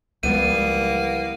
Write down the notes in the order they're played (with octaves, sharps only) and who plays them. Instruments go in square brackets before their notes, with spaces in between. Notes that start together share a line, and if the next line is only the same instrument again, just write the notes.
[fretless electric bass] C#2 F3 G#3 [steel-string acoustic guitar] E3 G3 B3 [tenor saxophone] A#3 [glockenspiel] D#7